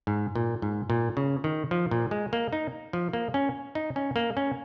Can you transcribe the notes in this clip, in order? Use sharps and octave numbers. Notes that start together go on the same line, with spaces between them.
G#2
A#2
G#2
A#2
C#3
D#3
F3
A#2
G#3
A#3
D#4
F3
A#3
C#4
D#4
C#4
A#3
C#4